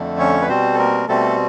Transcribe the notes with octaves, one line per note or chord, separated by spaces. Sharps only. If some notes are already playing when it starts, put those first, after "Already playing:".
Already playing: F2 D3 F3 A3
C#4 C#5
B4
B2 G3 C4 C5
A4
A#3 A#4
B2 G3 A3 C4 A4